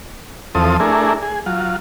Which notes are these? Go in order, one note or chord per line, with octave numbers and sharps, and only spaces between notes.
E2 F3 C4 A4 D#6
A3 D4 E4 G#4 A#4
G#4
F#3 F4